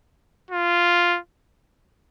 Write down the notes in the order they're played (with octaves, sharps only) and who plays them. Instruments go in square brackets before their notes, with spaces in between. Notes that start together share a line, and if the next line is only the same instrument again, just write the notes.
[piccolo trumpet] F4